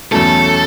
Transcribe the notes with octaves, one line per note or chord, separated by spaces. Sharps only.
E2 B2 F#3 A3 C#4 A4